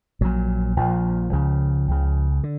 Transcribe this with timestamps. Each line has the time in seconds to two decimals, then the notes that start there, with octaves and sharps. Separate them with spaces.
0.21 A#1 A#2 F#3
0.77 A#1 A#2 F3
1.33 C#2 C#3
1.88 C#2 C#3
2.43 D3